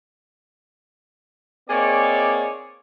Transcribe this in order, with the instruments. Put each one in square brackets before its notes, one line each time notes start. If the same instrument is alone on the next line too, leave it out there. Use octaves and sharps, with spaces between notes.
[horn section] A#3 C4 D#4 G#4 C#5 D5